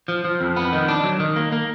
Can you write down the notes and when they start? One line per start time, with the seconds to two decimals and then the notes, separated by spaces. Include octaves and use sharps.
0.08 F3
0.25 F3
0.41 F2
0.56 B3
0.73 D#3
0.88 D4
1.04 F#3
1.20 D#3
1.36 A#3
1.52 A#3